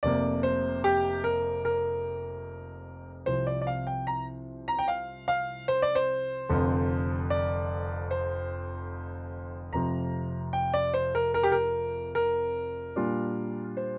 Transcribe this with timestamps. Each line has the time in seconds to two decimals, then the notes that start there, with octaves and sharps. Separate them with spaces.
0.03 F1 F2 C3 A#3 D5
0.43 C5
0.84 G4
1.24 A#4
1.65 A#4
3.26 C2 C3 F3 C4 C5
3.47 D5
3.62 D5
3.67 F5
3.87 G5
4.07 A#5
4.68 A#5
4.79 G5
4.88 F5
5.28 F5
5.68 C5
5.82 D5
5.95 C5
6.49 F1 F2 D3
7.30 D5
8.11 C5
9.72 F1 F2 C3 F3 A#5
10.53 G5
10.74 D5
10.94 C5
11.15 A#4
11.34 A#4
11.43 G4
11.52 A#4
12.15 A#4
12.96 A#2 G3 D4 F4
13.77 C5